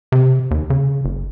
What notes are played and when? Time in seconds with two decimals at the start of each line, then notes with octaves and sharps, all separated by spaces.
0.12 C3
0.51 D#2
0.70 C#3
1.05 F#1